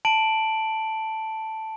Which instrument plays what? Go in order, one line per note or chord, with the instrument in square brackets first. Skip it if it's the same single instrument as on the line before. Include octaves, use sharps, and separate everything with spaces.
[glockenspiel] A5 D7 F#7